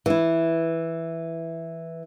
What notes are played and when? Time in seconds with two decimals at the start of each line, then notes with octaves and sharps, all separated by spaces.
0.06 E3 E4